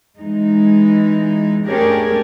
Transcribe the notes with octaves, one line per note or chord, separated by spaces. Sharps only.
E3 G#3 D#4
A3 C#4 D4 G4 G#4 A#4